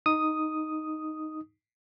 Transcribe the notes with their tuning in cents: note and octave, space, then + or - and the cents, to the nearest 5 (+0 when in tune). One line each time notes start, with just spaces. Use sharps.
D#4 +0 D#6 +0